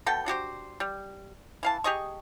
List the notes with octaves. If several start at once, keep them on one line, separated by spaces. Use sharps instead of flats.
B2 F#4 A4 G5
D4 F#4 G4 C5
G3
E3 F5 A5
G4 G#4 D#5 C#6